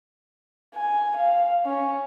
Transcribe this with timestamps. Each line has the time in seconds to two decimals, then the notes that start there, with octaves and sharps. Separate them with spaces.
0.75 G#5
1.17 F5
1.65 C#4